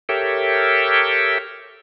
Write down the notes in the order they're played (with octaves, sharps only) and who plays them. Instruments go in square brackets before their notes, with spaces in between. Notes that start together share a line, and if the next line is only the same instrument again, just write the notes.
[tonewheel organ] G4 A4 A#4 C#5 E5 G5